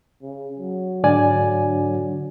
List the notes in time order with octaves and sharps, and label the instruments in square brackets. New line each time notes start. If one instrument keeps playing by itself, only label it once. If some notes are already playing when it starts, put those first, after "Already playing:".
[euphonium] C#3
F#3
[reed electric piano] G#2 D5 G#5 [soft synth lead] D3